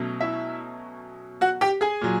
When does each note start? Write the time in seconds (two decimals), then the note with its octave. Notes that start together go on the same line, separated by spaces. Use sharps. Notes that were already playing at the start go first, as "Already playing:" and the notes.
Already playing: B2 F#3 A3 C#4
0.21 E4 E5
1.41 F#4 F#5
1.61 G4 G5
1.81 G#4 G#5
2.01 A#2 F#3